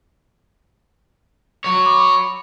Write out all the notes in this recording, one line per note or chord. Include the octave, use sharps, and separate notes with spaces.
F#4 C#5
B5 D6